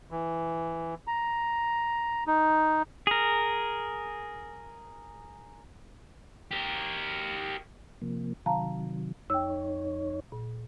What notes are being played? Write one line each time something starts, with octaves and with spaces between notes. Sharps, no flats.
E3
A#5
D#4
G#4 A#4
G4 A#4
C3 F3 A#3
C3 D#3 F#3 F5 A5 A#5
F2 D#4 C#5 G5 E6
A#2